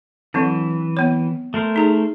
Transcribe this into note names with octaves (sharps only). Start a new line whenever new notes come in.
E3 F#3 C4 D4
B3 C#5
A3 A#4 C5
D#4 G#4